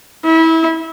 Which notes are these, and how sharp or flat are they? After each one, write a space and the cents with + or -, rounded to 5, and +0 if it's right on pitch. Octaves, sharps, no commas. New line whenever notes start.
E4 -25